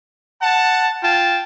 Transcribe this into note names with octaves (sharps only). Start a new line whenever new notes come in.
F#5 A5
F4 G5 A5